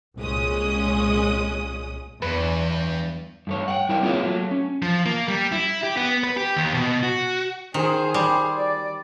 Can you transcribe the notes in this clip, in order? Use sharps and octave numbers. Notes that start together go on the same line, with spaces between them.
C2 A#2 G#3 C#4 D#6
E2 G2 B4
G2 A3 C#5
F#5 G5
G3 E4 A#4 C#5 D5 E5
A#3 C4 F4 G#4 C#5 E5
F#3 A3
C#4
F3
A#3
G3
E4
G4
B3
B4
G4
D#2
B2
F#4
D#3 G#4 C5
G3
D5